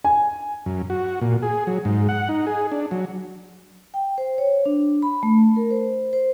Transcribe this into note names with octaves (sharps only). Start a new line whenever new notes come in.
G#5
F#2
F#4
A#2
G#4
F#3
G#2
F#5
D#4
G#4
D4
F#3
G5
C5
C#5
D4
B5
A3
A#4
C5
C5